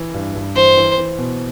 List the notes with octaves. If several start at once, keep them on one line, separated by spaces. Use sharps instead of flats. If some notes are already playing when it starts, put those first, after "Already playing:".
Already playing: E3
G2
G2
E3 C5
E3
E3
B2